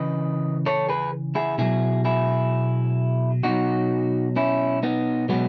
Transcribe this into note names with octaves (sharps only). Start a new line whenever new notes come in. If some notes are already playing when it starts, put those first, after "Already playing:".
Already playing: C#3 E3 B4 D#5
A4 C#5
G#4 B4
E4 G#4
B2 F#3 E4 G#4
E4 G#4
B2 F#3 D#4 F#4
C#4 E4
B3 D#4
B2 F#3 G#3 B3